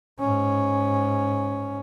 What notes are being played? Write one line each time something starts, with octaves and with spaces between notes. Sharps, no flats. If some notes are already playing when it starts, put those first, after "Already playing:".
G#2 C#4